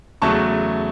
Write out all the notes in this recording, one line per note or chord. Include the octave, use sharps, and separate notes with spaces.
E2 C#3 F#3 A3 A5 C#6